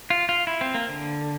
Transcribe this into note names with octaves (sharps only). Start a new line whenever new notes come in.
F4
F4
E4
C4
A#3
D3